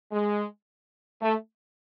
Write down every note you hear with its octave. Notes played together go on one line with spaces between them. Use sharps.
G#3
A3